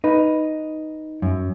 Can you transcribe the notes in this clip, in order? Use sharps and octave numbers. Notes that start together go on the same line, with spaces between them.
D#4 B4
F#2